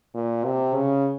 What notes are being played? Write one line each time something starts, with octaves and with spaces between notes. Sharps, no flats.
A#2
C3
C#3